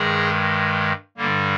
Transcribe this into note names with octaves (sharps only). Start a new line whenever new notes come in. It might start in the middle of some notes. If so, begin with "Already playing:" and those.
Already playing: G2 D#3 G#3 G#4
G2 D3 G3 A#3